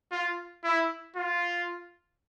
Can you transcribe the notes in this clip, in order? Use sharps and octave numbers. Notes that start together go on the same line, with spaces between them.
F4
E4
F4